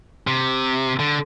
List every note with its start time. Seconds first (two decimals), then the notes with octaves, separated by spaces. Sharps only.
0.27 C3
0.99 D3